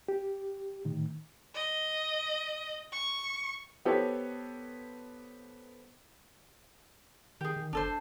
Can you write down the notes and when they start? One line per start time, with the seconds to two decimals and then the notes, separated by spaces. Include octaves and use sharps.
0.08 G4
0.85 A2 D#3
1.54 D#5
2.92 C#6
3.85 B3 G4 A4 C5 C#5
7.41 D#3 G4 G#4
7.56 D#3
7.73 F#1 D4 A4 C5